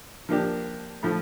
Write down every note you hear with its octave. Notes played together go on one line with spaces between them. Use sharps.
F3 A#3 D4 G4
A2 F3 A3